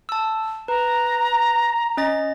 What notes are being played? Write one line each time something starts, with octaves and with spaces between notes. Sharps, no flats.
A5 E6
B4 A#5
C#4 D#5 A6